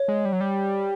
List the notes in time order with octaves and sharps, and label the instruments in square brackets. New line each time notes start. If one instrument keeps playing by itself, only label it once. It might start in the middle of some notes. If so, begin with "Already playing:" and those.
Already playing: [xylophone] C#5
[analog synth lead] G#3
G3
F#3
G3